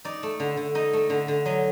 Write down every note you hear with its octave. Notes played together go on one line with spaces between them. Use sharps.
D#4 D5
A3
D3
D3
D#4 D#5
A3
D3
D3
F#3 D#5